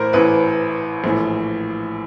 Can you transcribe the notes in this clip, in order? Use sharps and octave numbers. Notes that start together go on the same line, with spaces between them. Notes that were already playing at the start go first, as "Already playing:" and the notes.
Already playing: A1 A2 E3 A#4 C5
A1 A2 E3 B4
A#1 A2 E3